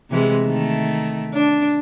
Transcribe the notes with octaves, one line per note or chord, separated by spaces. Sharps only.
C3 E3 G#3
D#3 A3
D4